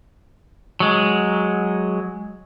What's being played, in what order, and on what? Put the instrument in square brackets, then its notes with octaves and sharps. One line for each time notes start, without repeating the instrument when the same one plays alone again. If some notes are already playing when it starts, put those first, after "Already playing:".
[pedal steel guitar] F#3 G#3